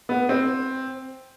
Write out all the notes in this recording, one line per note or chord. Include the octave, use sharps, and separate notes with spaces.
B3
C4